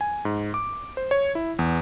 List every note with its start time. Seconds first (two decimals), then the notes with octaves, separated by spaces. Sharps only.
0.01 G#5
0.25 G#2
0.54 D6
0.97 C5
1.11 C#5
1.35 E4
1.59 E2